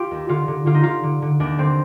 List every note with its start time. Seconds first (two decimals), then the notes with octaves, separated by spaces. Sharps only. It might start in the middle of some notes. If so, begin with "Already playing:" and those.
Already playing: F4 G4
0.11 D#2
0.29 D3 F4
0.48 D3
0.66 D3 F4
0.74 D#4
0.83 D3 F4
1.03 D3
1.22 D3
1.40 D#2 D4
1.58 D3 C4